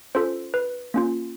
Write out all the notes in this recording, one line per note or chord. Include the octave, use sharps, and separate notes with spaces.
C#4 F4 A4 C5
B4
A#3 C#4 F4